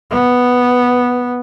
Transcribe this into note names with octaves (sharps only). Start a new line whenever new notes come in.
B3